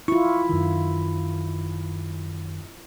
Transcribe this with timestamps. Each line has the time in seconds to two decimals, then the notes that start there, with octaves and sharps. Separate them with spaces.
0.08 E4 F4 C#6
0.49 F#2 D#3